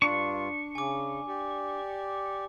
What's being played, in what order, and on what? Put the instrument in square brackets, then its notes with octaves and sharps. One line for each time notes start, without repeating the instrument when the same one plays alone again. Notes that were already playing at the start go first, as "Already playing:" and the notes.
[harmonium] G2 F4 [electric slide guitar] D4 [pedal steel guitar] C#6
[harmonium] C#3 [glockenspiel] G#5 D6
[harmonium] G4 D5